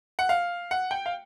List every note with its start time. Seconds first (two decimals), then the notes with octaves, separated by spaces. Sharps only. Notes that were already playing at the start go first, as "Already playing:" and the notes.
0.19 F#5
0.29 F5
0.71 F#5
0.91 G5
1.06 F5